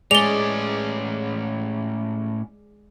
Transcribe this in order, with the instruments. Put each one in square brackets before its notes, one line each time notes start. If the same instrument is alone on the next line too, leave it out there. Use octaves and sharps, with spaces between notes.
[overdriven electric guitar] A2 C#4 [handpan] G#3 G#4 D5 [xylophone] F7 G7